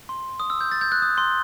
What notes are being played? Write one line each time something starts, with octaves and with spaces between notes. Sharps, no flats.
C6
D#6
E6
G6
A6
G6
F#6
D#6
C6